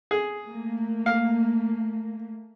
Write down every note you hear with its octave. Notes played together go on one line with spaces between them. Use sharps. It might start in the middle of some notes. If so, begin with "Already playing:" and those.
G#4
A3 A#3
F5